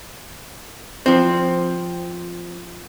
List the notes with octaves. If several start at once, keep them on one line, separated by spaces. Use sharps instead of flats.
F3 C4